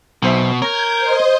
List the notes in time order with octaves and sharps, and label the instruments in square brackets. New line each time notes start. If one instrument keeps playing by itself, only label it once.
[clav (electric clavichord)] B1 C5 E5 [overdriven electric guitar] B2
[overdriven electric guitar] A#4 [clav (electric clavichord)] C#5 A#5 [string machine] G6 G#6
[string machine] C5 D#5